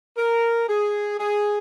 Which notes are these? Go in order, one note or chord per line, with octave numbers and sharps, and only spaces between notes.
A#4
G#4
G#4